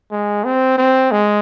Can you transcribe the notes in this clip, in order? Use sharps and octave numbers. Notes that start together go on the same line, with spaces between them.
G#3
C4
C4
G#3